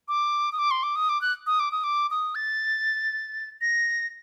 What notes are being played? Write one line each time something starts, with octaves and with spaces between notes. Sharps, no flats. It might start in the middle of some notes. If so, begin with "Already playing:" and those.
D6
D#6
D6
C6
D6
D#6
D6
F#6
D#6
D6
D#6
D6
D#6
A6
A#6